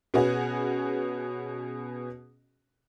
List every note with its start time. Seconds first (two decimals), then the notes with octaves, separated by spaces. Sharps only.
0.14 B2 B3 C#4 F#4 G#4